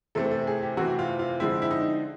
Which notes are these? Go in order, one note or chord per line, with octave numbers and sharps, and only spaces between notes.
C3 E3 A3 C4 A4
A4
G#4
G4
C3 E3 A3 C4 F#4
F4
F4
D3 F3 G#3 C4 E4
E4
D#4